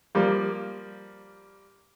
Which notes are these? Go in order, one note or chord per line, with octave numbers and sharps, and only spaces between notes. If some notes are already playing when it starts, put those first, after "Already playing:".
F3 G3 A#3